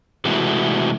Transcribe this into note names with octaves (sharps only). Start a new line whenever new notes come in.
C3 E3 G#3 A3 F#4